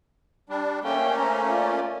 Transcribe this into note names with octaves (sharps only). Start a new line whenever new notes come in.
G3 D4
A3 A#3 C#4 G5
C5 A#5
F4 D5